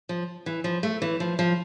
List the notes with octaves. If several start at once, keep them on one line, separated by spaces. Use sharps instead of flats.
F3
E3
F3
A3
E3
F3
F3